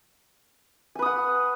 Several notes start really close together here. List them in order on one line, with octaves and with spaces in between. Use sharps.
G#5 B4 D#6 F#5